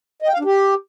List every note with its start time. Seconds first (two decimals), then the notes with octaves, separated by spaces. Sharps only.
0.22 D#5
0.28 G5
0.34 F5
0.39 D4
0.45 G4